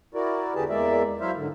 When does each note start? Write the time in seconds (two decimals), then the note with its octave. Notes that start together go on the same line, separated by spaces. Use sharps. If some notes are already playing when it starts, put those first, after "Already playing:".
0.14 E4 F#4 A#4 D5
0.55 E2 D3 G4 G#4 B4 A5
0.69 E2 G#3 A#3 D5 E5
1.20 F#3 E4 C5 E5 F5
1.36 G#2 D3